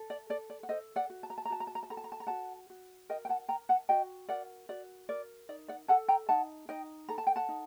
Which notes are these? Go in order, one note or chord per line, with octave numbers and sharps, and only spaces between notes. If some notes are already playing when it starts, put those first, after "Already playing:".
Already playing: A4
D5
A4 D5
D5
F#5
A4 C5 D#5
D5 F#5
F#4
A5
A#5
A5
A#5
F#4 A5
A#5
A5
A#5
A5
A4 A#5
A5
A#5
A5
A#5
F#4 F#5 A5
F#4
A#4 D#5 G5
G5
F#5 A5
A#4 G5 A#5
F#5 A5
F#4 D#5 G5
A#4 D5 F#5
F#4 D5
A#4 D5
D#4 D5
D5 F#5
A4 F#5 A5
G5 A#5
D#4 F#5 A5
D#4 D#5 G5
A4 A#5
A5
G5
F#5 A5
D#4